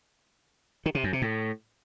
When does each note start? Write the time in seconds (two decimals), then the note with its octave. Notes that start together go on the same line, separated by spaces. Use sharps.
0.86 D#3
0.95 C3
1.04 F#2
1.13 C3
1.22 A2